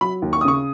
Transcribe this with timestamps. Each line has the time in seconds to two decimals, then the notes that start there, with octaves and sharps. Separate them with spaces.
0.01 F#3 B5
0.22 D#2
0.33 C#6
0.41 D#6
0.45 C#3 C#6